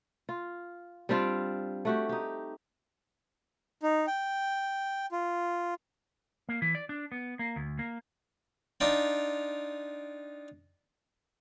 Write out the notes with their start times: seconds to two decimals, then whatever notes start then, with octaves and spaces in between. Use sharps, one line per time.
0.29 F4
1.09 G3 C4 D4 F4
1.85 A3 F#4 G4
2.09 D#4 G4
3.83 D#4
4.07 G5
5.12 F4
6.49 A#3
6.62 E3
6.75 D5
6.89 D4
7.12 B3
7.39 A#3
7.56 D2
7.79 A#3
8.80 D4 D#4 F4 G5